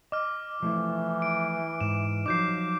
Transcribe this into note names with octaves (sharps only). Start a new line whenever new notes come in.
D#5 D6 F6
E3 F3 A3 E4
D7
G#2 E7
F3 F#3 D#4 D6 G6 C7